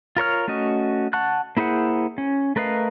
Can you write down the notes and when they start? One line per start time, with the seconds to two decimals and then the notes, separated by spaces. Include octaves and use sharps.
0.17 F4 A#4 C#5 F6
0.48 A3 C#4 F#4 D#5
1.13 F#5 A5 C#6 F#6
1.57 A#3 E4 G#4 C5 F#5
2.18 C#4
2.56 A3 A#4 B4 D#5 F5